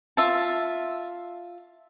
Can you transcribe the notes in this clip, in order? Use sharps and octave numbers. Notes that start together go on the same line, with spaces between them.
F4 E5 A5